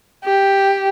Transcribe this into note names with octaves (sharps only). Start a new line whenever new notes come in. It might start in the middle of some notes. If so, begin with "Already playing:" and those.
G4